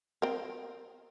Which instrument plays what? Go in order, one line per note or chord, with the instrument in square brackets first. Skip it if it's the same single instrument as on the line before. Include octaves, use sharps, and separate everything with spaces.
[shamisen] C4 A#4